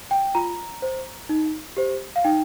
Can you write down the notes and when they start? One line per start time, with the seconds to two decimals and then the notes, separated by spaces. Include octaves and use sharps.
0.11 G5
0.35 F4 A#5
0.82 C5
1.29 D#4
1.77 G4 C5
2.16 F5
2.24 D#4 G5